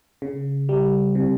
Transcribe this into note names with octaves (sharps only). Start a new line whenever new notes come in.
C#3
G3
C3